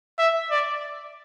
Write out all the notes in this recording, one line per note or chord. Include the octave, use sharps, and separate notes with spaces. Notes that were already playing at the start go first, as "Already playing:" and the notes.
E5
D5